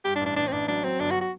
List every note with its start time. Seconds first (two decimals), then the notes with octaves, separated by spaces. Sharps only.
0.05 G2 G4
0.16 D4
0.21 A1
0.26 D4
0.36 A1 D4
0.47 C4
0.52 A1 D4
0.68 F#3 D4
0.84 F#3 C4
1.00 G1 D4
1.11 F#4
1.21 F#4